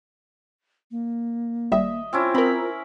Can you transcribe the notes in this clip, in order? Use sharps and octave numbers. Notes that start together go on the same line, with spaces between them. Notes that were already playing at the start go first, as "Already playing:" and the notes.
A#3
G#1 G3 D#5 E5
C4 C#4 E4 F4
C4 A#4 A#5 B5